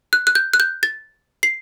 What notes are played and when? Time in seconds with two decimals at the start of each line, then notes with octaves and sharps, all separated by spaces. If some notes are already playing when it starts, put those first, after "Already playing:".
0.13 F#6
0.27 F#6
0.35 G6
0.53 F#6
0.60 G6
0.83 A6
1.43 C7